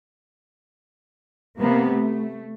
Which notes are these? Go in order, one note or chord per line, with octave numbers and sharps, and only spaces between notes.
C3 A#3 B3
A3